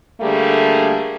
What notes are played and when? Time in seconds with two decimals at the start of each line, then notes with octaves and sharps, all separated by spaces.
0.21 D3 G3 A3 A#3 G#4